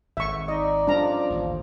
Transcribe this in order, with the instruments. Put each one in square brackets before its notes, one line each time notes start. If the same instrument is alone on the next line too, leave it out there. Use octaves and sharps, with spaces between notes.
[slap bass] G#1 [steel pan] E5 C#6
[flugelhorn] D#4 [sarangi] D5 [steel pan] D#5
[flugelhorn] F3 [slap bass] G3 C#4 [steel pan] D4 A#5
[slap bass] A1 D#2 G#2